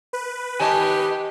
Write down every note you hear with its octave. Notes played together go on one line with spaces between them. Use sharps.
B4
D#3 G4 C#5 D#5 G#5 A5